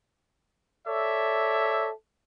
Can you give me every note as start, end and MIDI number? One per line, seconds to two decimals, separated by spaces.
0.88 1.91 69
0.88 1.91 73
0.88 1.91 74
0.88 1.91 76